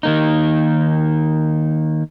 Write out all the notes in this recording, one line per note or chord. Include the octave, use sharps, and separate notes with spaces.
D#3 A#3 D#4